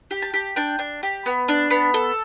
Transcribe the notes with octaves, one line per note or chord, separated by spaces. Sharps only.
G4
A5
G4
D4 G5
D4
G4
B3
D4
B3
A4